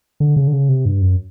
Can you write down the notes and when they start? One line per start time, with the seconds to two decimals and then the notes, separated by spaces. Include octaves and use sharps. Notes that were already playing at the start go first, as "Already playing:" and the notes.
0.20 D3
0.36 C#3
0.48 D3
0.53 C#3
0.69 C3
0.86 G2
1.02 F#2